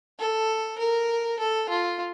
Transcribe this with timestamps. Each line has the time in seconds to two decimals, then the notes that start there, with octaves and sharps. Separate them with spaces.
0.19 A4
0.79 A#4
1.39 A4
1.69 F4